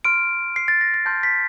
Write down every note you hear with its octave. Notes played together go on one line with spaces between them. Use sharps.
C6 F6 D7
C7
A6
A#6
A6
A5 C6 F6 G6
B6